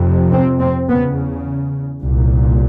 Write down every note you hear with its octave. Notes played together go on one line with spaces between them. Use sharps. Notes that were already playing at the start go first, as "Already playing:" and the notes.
Already playing: F2 C3
C4
C4
E2 C#3 B3
C2 A#2